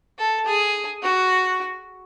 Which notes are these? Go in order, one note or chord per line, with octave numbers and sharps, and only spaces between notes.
A4
G#4
F#4